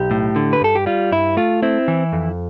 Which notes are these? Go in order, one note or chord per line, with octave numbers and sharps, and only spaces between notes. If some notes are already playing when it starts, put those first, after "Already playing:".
Already playing: B1 G4
A2
D3
B4
G2 A4
G4
G3 F4
G2 E4
A3 F4
C4 E4
E3
F2